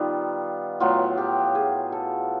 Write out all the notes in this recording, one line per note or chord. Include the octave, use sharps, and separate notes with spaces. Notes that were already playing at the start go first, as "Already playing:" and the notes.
Already playing: D#3 G3 B3 F4
A2 F#3 B3 F4
G4
G#4
A4